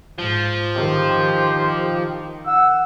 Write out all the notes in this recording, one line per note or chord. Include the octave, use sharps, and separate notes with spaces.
G#2 F3
D#3 G4 C5
F#5 E6